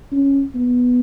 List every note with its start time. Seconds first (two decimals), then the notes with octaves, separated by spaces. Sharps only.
0.12 C#4
0.55 B3